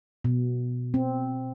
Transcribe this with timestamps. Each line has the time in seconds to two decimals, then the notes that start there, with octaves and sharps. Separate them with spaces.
0.24 B2
0.94 C4